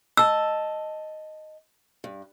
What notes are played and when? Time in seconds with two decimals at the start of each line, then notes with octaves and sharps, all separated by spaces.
0.17 D#5 A5 E6
2.04 G2